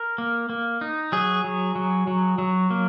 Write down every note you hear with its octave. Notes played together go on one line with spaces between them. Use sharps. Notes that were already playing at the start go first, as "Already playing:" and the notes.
Already playing: A#4
A#3
A#3
D#4
F#3 G#4
F#3
F#3
F#3
F#3
A#3